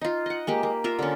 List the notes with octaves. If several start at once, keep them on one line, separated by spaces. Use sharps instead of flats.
D#4 F4
D#5 F#5
G#3 A#3 G4
A#3
F4 A#4 E5
D3 C#4